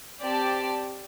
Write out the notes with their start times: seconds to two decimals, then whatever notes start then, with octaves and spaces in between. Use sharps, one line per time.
0.21 C4 G4 D5 A5